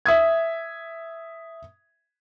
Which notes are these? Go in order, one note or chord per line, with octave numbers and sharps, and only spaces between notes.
E5 D#6 G#6